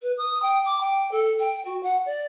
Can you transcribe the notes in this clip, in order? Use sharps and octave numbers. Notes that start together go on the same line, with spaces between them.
B4
D#6
G5
D6
G5
A4
G5
F#4
F#5
D5